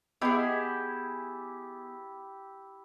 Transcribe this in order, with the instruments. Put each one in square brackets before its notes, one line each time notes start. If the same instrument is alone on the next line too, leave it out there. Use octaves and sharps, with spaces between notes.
[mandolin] B3 G#4 [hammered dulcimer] E4 G4 [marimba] D#5